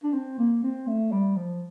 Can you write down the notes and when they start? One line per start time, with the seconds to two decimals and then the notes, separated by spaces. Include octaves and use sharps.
0.04 D4
0.13 C4
0.38 A#3
0.63 C4
0.87 A3
1.12 G3
1.36 F3